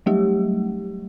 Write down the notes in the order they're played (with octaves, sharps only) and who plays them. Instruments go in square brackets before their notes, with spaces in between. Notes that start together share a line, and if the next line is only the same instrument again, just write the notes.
[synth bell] F#3 G3 A3 G4